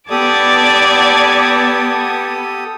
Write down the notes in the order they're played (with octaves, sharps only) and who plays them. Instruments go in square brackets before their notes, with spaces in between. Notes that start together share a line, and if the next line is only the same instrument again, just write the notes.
[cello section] B3 [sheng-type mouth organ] G4 A4 D#6 [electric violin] D5 [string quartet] A5 D6 G#6